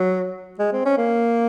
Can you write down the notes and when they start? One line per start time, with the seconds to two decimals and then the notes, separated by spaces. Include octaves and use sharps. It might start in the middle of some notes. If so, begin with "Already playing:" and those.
Already playing: F#3
0.59 G#3
0.73 C4
0.86 C#4
0.98 A#3